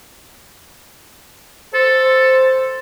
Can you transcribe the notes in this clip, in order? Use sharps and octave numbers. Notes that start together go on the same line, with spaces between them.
A4 C5